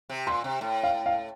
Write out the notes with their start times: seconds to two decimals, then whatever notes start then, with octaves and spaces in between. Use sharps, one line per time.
0.09 C3
0.27 A#2 C6
0.44 C3
0.61 A2
0.84 F5
1.06 F5